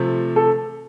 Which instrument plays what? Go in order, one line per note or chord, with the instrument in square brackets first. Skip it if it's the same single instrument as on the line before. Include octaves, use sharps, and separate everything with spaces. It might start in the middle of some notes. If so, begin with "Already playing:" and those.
Already playing: [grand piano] C3 F3 A3
[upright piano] A4